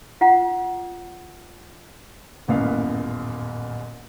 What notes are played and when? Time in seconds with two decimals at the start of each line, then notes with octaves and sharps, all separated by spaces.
0.21 F4 F#5
2.48 D#1 A1 F#2 A#2 B3 F5